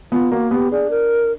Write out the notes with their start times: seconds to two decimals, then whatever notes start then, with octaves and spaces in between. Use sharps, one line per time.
0.12 B3 F4
0.32 A#3 F#4
0.51 B3 G4
0.71 D4 G#4
0.90 A#4